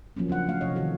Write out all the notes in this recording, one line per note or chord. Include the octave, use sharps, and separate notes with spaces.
F3 F#3 A#3 C#4
C#3 C4 D4 F#5
A3 A#3 F5
C3 F3 C#5 D#5
D3 D#3 F#4 A4